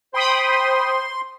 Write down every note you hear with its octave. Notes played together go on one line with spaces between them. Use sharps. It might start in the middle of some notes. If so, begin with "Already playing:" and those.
C5 G5 B5 C6 D#6